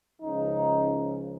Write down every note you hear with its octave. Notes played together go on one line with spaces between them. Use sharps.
C#2 C#3 F3 D#4